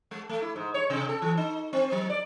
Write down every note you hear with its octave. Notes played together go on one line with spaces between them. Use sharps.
G#3
A3
E4
G#2
C#5
C3
A4
E3
D#4
C4
F#3
D5